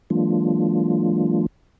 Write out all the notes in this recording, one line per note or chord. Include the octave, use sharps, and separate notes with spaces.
E3 F#3 G#3 A#3 D4 F4